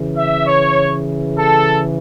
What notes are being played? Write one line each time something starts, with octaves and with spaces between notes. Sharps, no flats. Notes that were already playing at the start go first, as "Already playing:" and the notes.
Already playing: C#3 E3
E5
C#5
A4